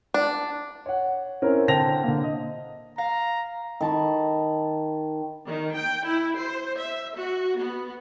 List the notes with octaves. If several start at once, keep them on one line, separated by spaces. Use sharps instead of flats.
D4
C#5 F#5
C4 C#4 E4 A#4
D3 C4 G5 A5 A#6 F7
D3 A#3
D#5
F5 A#5
D#3 A5 B5 C#6
D#3
G5
E4
C5
E5
F#4
B3